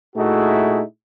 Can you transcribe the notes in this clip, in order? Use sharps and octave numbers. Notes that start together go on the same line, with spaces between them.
A#2 A3 D#4 E4 F#4 G#4